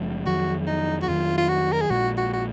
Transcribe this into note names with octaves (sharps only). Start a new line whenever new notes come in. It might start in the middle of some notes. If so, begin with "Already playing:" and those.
Already playing: F#1 F3 G#3
F2 D#3 F#3 F#4
D#4
F#4
F2 D#3 F#3 F4
F4
F#4
A#4
G#4
A#1 A#2 G#3 F#4
F#4
F#4